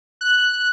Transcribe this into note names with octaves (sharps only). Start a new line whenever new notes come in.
F#6